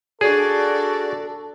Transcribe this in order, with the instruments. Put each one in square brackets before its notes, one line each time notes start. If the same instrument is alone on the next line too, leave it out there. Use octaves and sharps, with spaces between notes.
[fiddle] D4 D5 [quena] F#4 [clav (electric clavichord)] G#4 [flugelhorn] A4